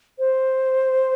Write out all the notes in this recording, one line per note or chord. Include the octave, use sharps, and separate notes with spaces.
C5